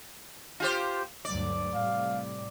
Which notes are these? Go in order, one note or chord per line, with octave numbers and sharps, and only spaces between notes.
F4 G4 C5
D2 G2 F#3 D5
A2 C3 G3 F5